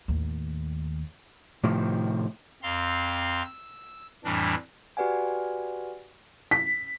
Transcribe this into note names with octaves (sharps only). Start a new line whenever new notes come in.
D#2 A2
A2 C3 D#3 F3
F2 C4 F5 A#5 C6
E6
F2 A2 E3 G3 D4
F#4 G4 B4 D5 F#5 G#5
B6